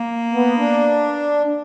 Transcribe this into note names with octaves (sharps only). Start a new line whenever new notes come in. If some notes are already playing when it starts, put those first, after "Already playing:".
Already playing: A#3
B3
D4